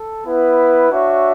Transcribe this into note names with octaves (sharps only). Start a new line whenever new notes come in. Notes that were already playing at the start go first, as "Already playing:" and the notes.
Already playing: A4
B3 E4 B4
D4 F#4 C#5 E5